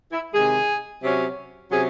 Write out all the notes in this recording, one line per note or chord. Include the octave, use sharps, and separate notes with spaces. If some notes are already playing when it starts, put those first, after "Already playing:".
E4
C3 D#3 G#3 G#4
C3 F#3 C#4
C3 F#3 C#4 G#4